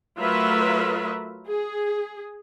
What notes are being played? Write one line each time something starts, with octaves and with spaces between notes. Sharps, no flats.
F#3 A3 F4 A#4 B4 E5
G#4